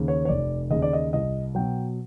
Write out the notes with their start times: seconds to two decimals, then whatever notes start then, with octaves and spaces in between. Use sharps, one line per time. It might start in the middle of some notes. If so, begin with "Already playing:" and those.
Already playing: D#2 C#3
0.08 C#5
0.25 C#5
0.29 F1 D5
0.71 D#2 C#3 D#5
0.82 D5
0.93 D#5
1.13 C2 D#5
1.55 B2 F#3 G5